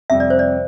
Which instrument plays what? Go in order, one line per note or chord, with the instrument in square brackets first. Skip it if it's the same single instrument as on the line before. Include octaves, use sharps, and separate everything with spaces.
[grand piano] F2 C3 G3 [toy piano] E5
[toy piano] D5
C5
D5